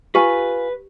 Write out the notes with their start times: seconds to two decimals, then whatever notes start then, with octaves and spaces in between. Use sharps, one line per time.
0.15 F4 G4 B4 G#5